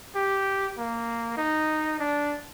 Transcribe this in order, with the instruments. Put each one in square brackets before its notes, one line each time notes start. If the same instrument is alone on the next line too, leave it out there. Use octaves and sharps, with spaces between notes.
[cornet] G4
A#3
D#4
D4